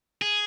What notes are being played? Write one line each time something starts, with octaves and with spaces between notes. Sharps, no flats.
G#4